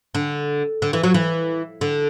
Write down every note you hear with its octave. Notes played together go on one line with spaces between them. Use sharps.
D3
D3
E3
F#3
E3
D3